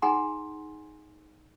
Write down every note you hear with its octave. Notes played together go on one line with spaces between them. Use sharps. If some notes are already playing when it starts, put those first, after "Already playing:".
D#4 G#4 F#5 G#5 A#5 C6